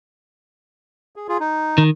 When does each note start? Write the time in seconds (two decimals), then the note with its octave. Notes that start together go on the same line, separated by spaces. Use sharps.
1.16 G#4
1.29 F4 G#4
1.40 D#4
1.78 D#3